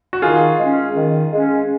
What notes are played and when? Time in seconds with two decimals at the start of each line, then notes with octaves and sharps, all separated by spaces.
0.13 F#4
0.22 D#3 F4 G#4
0.59 G#3 C#4
0.95 D#3
1.32 G#3 C#4